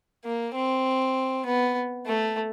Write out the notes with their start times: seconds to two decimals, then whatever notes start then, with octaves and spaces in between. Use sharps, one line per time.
0.24 A#3
0.55 C4
1.46 B3
2.06 A3